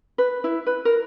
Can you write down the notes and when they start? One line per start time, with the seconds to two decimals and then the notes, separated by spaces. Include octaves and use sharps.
0.18 B4
0.44 E4
0.67 B4
0.85 A#4